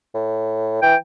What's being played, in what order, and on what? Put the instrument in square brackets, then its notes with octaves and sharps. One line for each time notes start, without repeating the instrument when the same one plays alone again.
[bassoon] A2
[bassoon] E3 [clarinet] G5